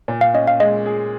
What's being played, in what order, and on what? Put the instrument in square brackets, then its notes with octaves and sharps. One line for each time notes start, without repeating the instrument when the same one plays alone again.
[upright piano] A#2
[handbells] F5
[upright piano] C#4 [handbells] D#5
[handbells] F5
[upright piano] G#3 [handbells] D#5
[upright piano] G#4